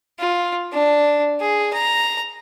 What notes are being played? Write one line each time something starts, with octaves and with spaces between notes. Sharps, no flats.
F4
D4
G#4
A#5